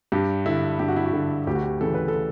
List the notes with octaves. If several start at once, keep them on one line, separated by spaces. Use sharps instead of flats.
G2 G4
D3 E4
G2 G4
F#4
E4
F#4
D3
D2 G4
F#4
G4
C#3 E3 A4
B4
A4